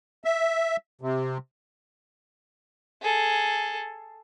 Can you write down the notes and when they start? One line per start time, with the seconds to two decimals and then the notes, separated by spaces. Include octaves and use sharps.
0.24 E5
1.01 C3
3.02 G#4 A4